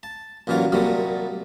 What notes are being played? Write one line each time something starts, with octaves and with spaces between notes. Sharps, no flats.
A5
A1 A#2 E3 F#3 F4
C2 A#2 F#3 G3 A3